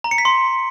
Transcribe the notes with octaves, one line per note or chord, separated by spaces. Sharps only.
A#5
C#7
B6
C6